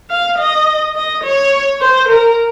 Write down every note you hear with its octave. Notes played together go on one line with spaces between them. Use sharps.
F5
D#5
D#5
C#5
C5
A#4